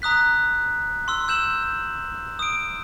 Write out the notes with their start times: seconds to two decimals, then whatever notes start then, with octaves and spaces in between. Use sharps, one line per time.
0.02 A#5 D#6 F#6 B6
1.08 C6 E6
1.28 E6 G6 E7 F#7
2.39 D#6 D7